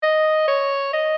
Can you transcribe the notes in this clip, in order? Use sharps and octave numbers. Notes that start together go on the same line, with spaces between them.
D#5
C#5
D#5